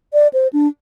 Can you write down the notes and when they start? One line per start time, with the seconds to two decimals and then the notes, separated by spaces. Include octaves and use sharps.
0.13 D5
0.33 C5
0.53 D4